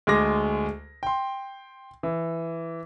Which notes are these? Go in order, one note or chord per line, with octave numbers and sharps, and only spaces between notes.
D2 G#3 G#4 D6 A#6
G5 C6
E3